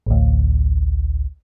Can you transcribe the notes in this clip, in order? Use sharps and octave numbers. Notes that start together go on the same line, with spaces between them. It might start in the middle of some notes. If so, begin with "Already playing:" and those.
A1 D2